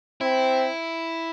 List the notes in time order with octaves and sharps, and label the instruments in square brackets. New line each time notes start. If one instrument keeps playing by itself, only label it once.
[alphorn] C4 [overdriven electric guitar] E4